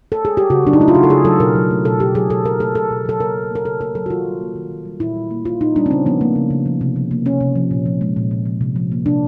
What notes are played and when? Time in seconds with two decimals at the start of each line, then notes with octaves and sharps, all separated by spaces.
0.12 A4
0.25 G#4
0.37 G4
0.50 C#3 F#4
0.65 F#3 D4
0.73 D#4
0.80 A3 E4
0.88 F4
0.95 C#3 F#4
1.03 A4
1.10 C#3 G#4
1.25 F#3 A4
1.40 B2 A#4
1.55 F#3
1.70 A3
1.85 B2 A4
2.00 B2 G4
2.15 F#3 G#4
2.30 B2 A4
2.45 F#3 A#4
2.60 A3 A4
2.75 B2 A4
2.91 B2
3.05 F#3 A4
3.20 C#3 A#4
3.35 F#3
3.51 A#3 A#4
3.65 C#3 A4
3.80 C#3 A#4
3.95 F#3 A4
4.06 F#4
4.10 D#3 F4
4.25 G3
4.41 A#3
4.56 D#3
4.71 D#3
4.85 G3
5.00 A#2 E4
5.15 G3
5.31 A#3
5.45 A#2 F4
5.60 A#2 D#4
5.76 G3 D4
5.86 C4
5.91 C#3 C#4
6.06 F3 B3
6.21 A3 A#3
6.36 C#3
6.50 C#3
6.66 F3
6.81 C3
6.96 F3
7.11 A#3
7.26 C3 C#4
7.41 C3
7.56 F3
7.71 A#2
7.86 F3
8.01 G#3
8.16 A#2
8.31 A#2
8.46 F3
8.61 C3
8.76 F3
8.92 A#3
9.06 C3 D4